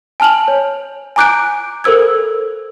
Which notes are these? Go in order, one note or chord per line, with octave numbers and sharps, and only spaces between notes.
G#5 A5 F6 F7 F#7
C#5
G#5 A#5 D6 F#6 G6 D7
A4 A#4 C5 E6 G#6